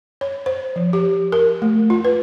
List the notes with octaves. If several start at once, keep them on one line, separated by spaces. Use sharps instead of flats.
C#5
C5
F3
G4
A#4
A3
F4
B4